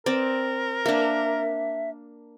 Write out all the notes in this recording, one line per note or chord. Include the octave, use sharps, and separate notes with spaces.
C4 A#4 D5
A#3 D4 E5